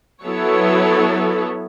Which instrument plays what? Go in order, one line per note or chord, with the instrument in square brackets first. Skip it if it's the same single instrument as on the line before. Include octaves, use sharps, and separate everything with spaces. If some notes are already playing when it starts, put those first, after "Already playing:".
[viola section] F#3 B3 E4 A4 C#5